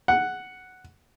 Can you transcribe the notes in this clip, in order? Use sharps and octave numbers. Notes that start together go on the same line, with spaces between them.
F#5